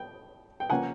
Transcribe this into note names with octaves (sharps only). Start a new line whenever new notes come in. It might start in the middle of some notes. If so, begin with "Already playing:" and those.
Already playing: G5
G5
C#3 F3 A#3 C#4 F#5 G#5